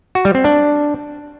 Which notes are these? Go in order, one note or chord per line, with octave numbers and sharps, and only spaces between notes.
F#4
G3
C4
D4